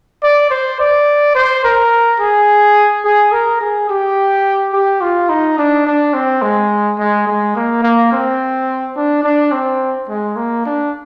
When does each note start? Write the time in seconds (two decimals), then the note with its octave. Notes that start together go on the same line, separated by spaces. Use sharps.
0.23 D5
0.50 C5
0.80 D5
1.35 C5
1.64 A#4
2.20 G#4
3.05 G#4
3.32 A#4
3.61 G#4
3.90 G4
4.73 G4
5.01 F4
5.29 D#4
5.58 D4
5.87 D4
6.14 C4
6.42 G#3
6.99 G#3
7.27 G#3
7.56 A#3
7.83 A#3
8.12 C4
8.97 D4
9.24 D4
9.52 C4
10.09 G#3
10.36 A#3
10.66 D4